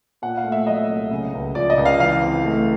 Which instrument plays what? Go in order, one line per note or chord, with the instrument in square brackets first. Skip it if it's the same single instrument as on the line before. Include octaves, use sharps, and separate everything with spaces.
[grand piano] A#2 F#5
F5
A3
E5
F#3 D#5
C2
C#3
C#2
F3 D5
D#5
C#2
F5
E3 F5
C4
A3